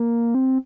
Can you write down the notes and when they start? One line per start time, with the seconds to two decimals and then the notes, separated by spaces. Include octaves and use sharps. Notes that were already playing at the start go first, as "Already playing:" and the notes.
Already playing: A#3
0.35 C4